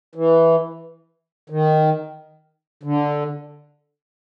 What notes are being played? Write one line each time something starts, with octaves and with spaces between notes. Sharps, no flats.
E3
D#3
D3